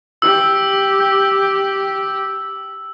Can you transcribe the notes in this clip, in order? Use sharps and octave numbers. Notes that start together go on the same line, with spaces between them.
G4 E6